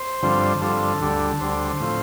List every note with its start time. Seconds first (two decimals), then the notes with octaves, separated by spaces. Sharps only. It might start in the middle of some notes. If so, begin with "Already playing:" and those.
Already playing: C5
0.22 G2 D3 F3 C4
0.61 G2 D3 F3 C4 A4
1.00 D2 D3 G3
1.40 D2 D3 G3 C5
1.80 A2 F3 C4